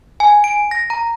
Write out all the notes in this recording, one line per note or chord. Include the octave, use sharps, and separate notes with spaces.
G#5
D7
A#6
A#5